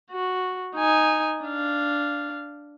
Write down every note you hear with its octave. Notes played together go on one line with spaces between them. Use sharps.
F#4
D#4 G#5
D4 F5